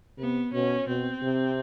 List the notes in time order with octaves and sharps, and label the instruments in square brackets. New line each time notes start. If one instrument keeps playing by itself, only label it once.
[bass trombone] C3 [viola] B3
[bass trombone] B2 [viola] C#4
[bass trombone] B2 [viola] C4
[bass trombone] C3